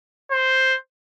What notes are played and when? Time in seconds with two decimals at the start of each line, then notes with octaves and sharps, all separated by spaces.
0.31 C5